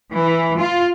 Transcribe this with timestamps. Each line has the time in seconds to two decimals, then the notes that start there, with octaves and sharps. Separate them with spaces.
0.13 E3
0.59 F4